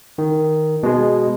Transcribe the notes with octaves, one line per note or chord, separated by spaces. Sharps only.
D#3
B2 G#3